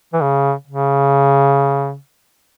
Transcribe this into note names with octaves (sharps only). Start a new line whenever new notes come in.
E3
C#3
C#3